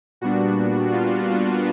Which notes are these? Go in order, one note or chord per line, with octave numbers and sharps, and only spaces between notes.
A#2 G3 B3 D4 F#4
F4
F#4